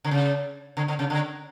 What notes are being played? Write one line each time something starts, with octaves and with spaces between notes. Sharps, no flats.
D3
C#3
D3
D3
C#3
D3